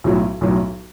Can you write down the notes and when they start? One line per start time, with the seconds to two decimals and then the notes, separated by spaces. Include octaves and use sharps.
0.04 B1 A2 F#3
0.41 B1 A2 F#3